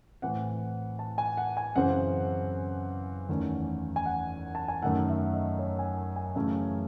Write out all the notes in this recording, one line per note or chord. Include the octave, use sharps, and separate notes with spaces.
A2 E3 C4 F#5
A5
G#5
F#5
G#5
F#2 C#3 E3 C4 F#5
E2 D#3 A3 C#4
G#5
F#5
A5
G#5
F#2 D#3 A3 F#5
E5
D#5
C#5
G#5
G#5
F#2 C#3 E3 A3 C#4